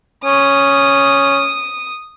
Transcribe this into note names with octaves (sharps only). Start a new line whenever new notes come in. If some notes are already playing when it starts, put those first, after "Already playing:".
C#4 D#6